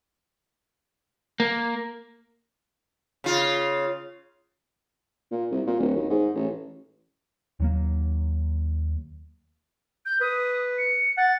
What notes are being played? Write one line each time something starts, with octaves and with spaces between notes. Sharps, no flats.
A#3
C#3 F4
A#2
C2
A#2
D1
D#2
G#2
A1
D#2 F#3 A#3
G6
B4 D#6
C#7
F#5 A6